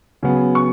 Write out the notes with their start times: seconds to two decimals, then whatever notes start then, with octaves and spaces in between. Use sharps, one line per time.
0.23 C#3 F#3 B3
0.55 C#6